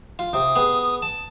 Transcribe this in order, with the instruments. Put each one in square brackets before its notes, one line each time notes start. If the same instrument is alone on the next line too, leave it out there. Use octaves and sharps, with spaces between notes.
[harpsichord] F4
[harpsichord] C3 [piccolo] D#6
[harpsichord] B3 G#4
A5